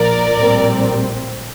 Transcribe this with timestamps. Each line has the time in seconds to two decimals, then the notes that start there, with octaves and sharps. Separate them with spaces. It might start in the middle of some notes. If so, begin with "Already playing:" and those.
Already playing: A#1 A#2 F3 A#4 D5
0.37 A#1 A2 G3 C4